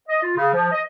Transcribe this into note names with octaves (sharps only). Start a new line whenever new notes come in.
D#5
F4
C#3
F3
D#5